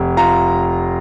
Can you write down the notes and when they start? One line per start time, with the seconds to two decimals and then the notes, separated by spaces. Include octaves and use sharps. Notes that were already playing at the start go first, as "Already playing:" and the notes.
Already playing: F1
0.17 F4 A#5